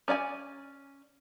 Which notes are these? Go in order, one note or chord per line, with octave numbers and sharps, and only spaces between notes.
C#4 D5 F5 G#5